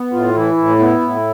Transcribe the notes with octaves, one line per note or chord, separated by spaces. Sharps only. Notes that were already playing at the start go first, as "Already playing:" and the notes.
Already playing: B3
A2 F4
E3 E4
A2
B3
A2